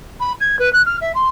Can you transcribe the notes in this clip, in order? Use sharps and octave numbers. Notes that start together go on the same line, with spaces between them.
B5
G#6
B4
F#6
F6
E5
C6